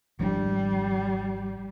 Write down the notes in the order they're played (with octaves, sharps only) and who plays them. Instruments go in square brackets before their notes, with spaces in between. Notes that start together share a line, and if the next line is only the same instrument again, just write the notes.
[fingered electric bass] G#1 F3 D4 [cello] G3